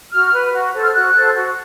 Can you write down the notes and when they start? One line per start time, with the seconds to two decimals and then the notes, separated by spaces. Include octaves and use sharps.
0.12 F#4 F6
0.32 B4
0.52 F#4
0.74 A4 C5
0.83 F6
0.93 F#4 F#6
1.13 A4 C5
1.35 F#4